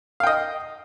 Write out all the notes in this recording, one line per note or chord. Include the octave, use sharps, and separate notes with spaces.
D#5 F5 G5